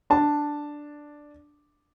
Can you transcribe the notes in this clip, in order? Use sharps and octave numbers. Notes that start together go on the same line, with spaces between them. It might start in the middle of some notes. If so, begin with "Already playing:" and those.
D4 A5